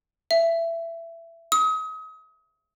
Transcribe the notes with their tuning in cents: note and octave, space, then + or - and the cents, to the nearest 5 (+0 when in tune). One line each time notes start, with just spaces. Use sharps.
E5 +20
D#6 +35